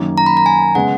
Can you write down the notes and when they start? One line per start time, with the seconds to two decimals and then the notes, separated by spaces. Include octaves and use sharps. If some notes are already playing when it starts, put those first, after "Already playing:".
Already playing: F#2 D#3 A#3 C#4
0.18 A#5
0.26 B5
0.37 A#5
0.46 G#5
0.75 C#3 G#3 B3 F#5